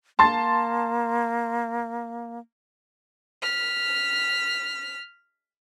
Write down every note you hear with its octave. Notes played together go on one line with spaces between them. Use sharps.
A#3 A5 C6 A6
F6 B6